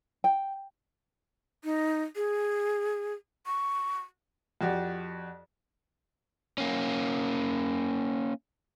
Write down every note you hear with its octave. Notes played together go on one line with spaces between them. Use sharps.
G5
D#4
G#4
C#6
F2 F#4 G4 D5
A#3 C#4